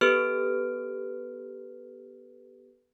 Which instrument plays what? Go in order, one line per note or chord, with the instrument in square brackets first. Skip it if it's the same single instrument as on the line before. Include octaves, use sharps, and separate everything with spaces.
[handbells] B3 G4 A4 B4 F6 D7